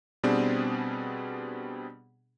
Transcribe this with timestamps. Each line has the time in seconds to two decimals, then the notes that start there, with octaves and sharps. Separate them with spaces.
0.23 B2 G3 B3 C4 D4 G#4